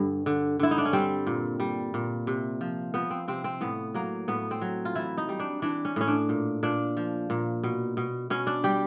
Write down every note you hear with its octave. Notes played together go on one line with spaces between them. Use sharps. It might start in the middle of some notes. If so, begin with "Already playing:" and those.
Already playing: G2 D3
D3
D3 E4
D#4
D4
C#4
G3 C4
A#2
G3
A#2
C3
F3
F3 B3
C4
C3 C4
C4
A2 B3
F#3 A#3
A2 B3
C4
F#3
F4
E3 E4
D#4
G3
D4
E3 D4
C#4
A2 C#4
D4
A#2
A#2 D4
F3
A#2
B2
B2
B2 C#4
D4
G3 G4